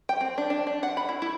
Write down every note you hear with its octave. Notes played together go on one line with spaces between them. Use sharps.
G5
C4
D4
D4
D4
F#5
B5
E4
E4